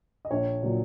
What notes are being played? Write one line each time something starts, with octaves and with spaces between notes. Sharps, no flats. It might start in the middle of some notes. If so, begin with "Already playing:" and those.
D#5
A#1 C#5
A#2 F#3